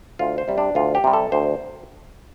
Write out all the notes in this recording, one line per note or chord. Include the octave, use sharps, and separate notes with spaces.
D2 F4
C5
C3 G3
D4
D2 F4
G4
C3 G3
A4
D2 C5